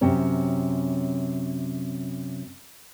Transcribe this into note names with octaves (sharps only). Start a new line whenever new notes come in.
F#2 C3 C#4